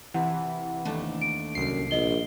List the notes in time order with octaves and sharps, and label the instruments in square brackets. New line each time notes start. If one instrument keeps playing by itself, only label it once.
[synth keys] C3 E3 [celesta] F#5
[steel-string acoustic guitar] D#2 A3 D4
[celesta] D7
[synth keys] C2 C7 [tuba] F#2
[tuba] A#1 [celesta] D#5 G7